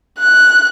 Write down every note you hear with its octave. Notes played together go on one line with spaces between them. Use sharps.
F#6